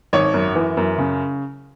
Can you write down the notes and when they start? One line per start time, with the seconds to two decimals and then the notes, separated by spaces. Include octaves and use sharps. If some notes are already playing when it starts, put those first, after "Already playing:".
0.13 G#1 C#5
0.34 F#2
0.55 E3
0.77 F#2
0.98 C#3